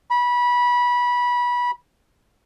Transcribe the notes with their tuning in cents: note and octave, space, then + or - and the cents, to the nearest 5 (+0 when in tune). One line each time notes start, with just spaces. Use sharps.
B5 -20